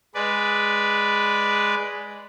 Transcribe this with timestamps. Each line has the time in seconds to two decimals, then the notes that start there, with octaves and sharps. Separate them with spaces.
0.15 G#3 B4 D5